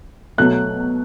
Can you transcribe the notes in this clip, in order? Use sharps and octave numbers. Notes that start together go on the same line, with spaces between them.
B2 F#3 A3 F#6